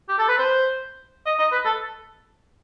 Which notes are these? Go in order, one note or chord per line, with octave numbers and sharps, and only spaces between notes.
G4
A4
B4
C5
D#5
D#5
B4
A4